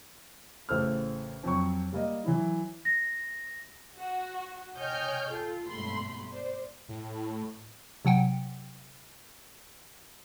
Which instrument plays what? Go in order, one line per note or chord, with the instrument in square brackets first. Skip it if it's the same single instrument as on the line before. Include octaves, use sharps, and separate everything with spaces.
[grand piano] A1 C#3 A4 C5 E6 F6
F2 F#3 C#6
G3 A#3 D5 D#5
E3 F#3 E4
[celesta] A#6
[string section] F#4
C#5 D#5 G5 G#5 F6 G6
F4 A4
G#1 G2 B2 A3 B5 C6
C5 D5
[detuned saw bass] A2
[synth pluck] C3 F#3 F#5 G5